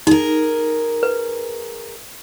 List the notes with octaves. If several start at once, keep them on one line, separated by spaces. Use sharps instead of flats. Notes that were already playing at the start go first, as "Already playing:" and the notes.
D#4 G#4 A#4
B4